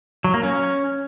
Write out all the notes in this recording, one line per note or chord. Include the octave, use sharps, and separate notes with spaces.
F#3
A#3
C#4